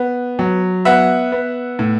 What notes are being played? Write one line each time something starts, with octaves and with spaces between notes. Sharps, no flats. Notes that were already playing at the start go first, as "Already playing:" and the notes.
Already playing: B3
F#3
B3 E5 F#5
B3
A2